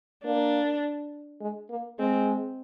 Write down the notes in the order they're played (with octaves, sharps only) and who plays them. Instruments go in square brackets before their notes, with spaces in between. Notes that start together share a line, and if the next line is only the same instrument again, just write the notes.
[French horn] A#3 [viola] D4
[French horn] G#3
A#3
[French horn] G#3 [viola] C4